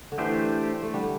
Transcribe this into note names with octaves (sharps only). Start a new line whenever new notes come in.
D3
E3 A3 D4 G4 C5
A3
D3 G3